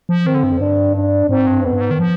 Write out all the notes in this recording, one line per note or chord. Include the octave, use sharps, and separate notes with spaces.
F3
D#3 C4
D3
G2
F2
G2 D4
D4
G#2 C4
G2
F2 B3
G2
G#2
D#3
F3